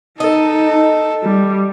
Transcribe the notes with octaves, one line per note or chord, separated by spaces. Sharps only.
D#4 A4 D#5
G3